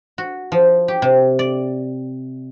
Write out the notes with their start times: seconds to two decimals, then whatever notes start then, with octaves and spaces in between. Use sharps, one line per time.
0.18 F#4
0.52 F3
0.88 G4
1.02 C3
1.39 D5